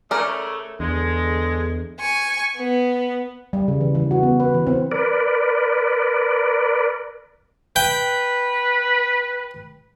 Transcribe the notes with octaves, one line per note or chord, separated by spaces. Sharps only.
C#3 A3 A#4 D5
E2 D3 G#3
G#5 C#6
B3
G3
C#3
E3
E3
F#4
B3
B4
E3
C4
A#4 B4 D5
B4 G5